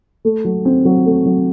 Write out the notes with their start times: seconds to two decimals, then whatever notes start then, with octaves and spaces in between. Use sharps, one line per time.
0.25 A3
0.45 F#3
0.65 C4
0.85 F#3
1.06 A3
1.26 F#3